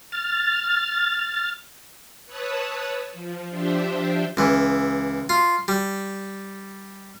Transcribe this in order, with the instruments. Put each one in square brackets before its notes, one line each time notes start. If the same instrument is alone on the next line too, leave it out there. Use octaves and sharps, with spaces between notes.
[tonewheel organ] F6 A6
[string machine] B4 C#5 A5 D#6 E6 F#6
F3
F3 D4 G4 C5 E5
[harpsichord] C#2 E3
F4
G3